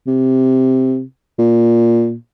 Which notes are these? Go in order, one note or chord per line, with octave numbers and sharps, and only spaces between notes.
C3
A#2